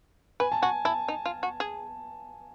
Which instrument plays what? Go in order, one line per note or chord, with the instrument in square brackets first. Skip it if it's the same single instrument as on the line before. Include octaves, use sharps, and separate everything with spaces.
[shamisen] B4 [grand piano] G#5
[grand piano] A5
[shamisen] F#4 [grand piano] G#5
[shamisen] E4 [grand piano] A5
[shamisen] D#4
F4
F#4
G#4